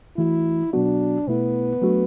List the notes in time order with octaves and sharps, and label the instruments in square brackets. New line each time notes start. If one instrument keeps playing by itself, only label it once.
[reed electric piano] E3 A3 F#4 [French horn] E4
[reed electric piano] B2 F#3 B3 F#4 [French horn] D4
[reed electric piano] B2 A3 E4 [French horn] B3
[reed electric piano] F#3 A3 D4 F#4